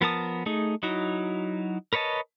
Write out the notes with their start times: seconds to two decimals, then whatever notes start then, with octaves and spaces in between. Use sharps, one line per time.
0.01 F3 B3 A#4 A5 D#6
0.46 A3 D#4 G#4
0.83 F#3 D#4 E4 F#4
1.93 A#4 B4 C#5 D#5 A5